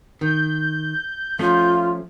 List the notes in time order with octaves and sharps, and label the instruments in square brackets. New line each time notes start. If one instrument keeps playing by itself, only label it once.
[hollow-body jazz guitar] D#3 [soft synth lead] G6
[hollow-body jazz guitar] F3 A3 C#4 [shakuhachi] F4